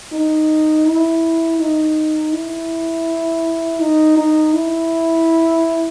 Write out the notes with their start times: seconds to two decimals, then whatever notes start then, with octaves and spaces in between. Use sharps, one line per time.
0.12 D#4
0.86 E4
1.60 D#4
2.33 E4
3.80 D#4
4.17 D#4
4.54 E4